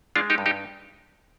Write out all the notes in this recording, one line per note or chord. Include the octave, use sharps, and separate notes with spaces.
G#3 D4 F4
D#4 G4
G2
D#4 G4